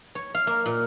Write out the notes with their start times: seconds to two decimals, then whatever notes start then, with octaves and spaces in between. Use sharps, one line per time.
0.15 C#5
0.35 F5
0.47 A#3
0.66 A#2